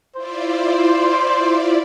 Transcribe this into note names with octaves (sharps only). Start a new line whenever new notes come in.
E4 F4 C5 D5